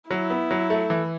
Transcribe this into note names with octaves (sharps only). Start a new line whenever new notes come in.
F#3 E4
B3
F#3
A3
E3